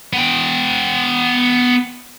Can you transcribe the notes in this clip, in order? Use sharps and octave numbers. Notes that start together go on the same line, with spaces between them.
B3 G5